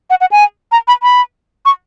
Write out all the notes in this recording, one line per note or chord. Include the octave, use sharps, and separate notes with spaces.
F#5
F#5
G#5
A#5
B5
B5
C#6